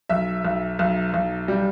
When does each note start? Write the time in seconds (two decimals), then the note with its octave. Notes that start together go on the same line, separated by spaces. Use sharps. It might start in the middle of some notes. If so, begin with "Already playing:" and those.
0.09 B1 E5
0.45 B1
0.79 B1
1.14 B1
1.48 G3